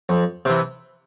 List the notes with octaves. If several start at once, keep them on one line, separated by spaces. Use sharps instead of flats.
F2
C3 E3